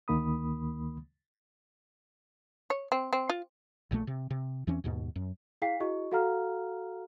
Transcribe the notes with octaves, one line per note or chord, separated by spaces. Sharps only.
D2 D#3 A#3 B5 D#6
C#5
C4
C4
F4
A#1 A#2 D#3 A3
C3
C3
E2 E3 C4 C#4
D#2 G#2 B2
F#2
E4 G#4 F5 G5 B6 C7
E4 F#4 G#4 D#5 C#6
F#4 A4 F5 F#5 A#5 F6